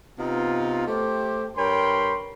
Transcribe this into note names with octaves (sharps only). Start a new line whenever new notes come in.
C3 B3 D#4 F4
A3 G4 C5
G2 A#4 C#5 G5 B5 C6